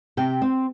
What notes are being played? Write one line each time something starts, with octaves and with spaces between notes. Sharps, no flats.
C3 G5
C4